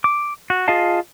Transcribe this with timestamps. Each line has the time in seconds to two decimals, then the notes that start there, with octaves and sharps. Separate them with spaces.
0.04 D6
0.50 F#4
0.68 F4 G#4 D#5 F5 A5